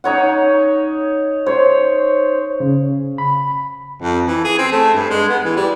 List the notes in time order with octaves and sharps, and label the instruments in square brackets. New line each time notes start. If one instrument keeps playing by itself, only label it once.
[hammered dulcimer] D#4 C#5 F#5
[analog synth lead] C5 [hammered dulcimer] C#5
[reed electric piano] C#3
B5
[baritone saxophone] F2
E3
G#4
C4
A3
G2
G#3
B3
E3
G3